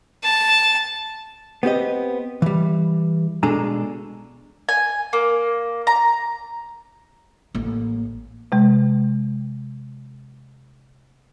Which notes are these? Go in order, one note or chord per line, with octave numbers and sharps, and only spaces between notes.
A5
B3 C4 G4 D#5
E3 G3
B2 G#3 D4 G#4 A4 A#5
G#5
A#3
A#5
A1 A#3
C3 G#3